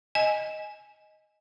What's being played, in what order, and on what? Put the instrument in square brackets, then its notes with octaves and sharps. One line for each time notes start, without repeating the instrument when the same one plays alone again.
[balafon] D#5 G#5